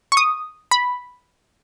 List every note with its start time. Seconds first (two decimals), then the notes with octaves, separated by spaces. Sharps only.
0.12 C#6
0.17 D#6
0.71 B5